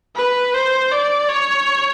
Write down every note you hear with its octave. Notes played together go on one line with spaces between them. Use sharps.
B4
C5
D5
C#5